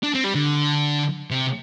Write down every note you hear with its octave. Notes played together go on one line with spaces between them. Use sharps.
D4
C4
G3
D3
C3